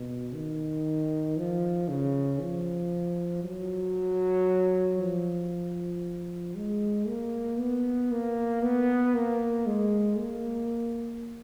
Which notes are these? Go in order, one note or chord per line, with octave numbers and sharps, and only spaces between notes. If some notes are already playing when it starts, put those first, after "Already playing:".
Already playing: B2
D#3
F3
C#3
F3
F#3
F3
G#3
A#3
B3
A#3
B3
A#3
G#3
A#3